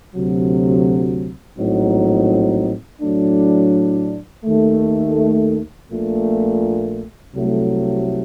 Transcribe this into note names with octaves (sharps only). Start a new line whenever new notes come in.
D2 C3 F#3
A#1 A2 F#3 C4 D#4
A2 F#3 A3 D4
D#2 D#3 A3
A#1 A#2 A3
C2 C3 F#3 A3